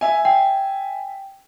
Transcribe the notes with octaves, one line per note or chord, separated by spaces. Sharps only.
E5 G#5
G5